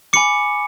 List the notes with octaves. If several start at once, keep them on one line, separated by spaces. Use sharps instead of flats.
G#5 B5 D6 C#7